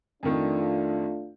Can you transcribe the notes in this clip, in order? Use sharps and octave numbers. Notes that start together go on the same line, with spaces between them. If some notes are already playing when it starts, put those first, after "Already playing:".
F2 D#3 A3 D4 F4